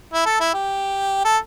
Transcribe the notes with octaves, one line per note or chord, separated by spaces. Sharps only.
E4
A4
E4
G4
A4